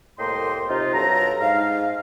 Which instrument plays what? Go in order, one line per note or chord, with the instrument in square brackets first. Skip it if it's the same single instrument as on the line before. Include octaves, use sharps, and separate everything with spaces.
[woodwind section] C2 A2 A#3 D#5 G5 C6
C3 D#4 F4
G2 F#3 A4 A#5
G#2 F5